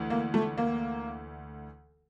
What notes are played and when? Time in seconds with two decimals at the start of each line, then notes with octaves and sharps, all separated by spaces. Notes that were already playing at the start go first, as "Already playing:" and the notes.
Already playing: D2 E3
0.10 A#3
0.34 A3
0.58 A#3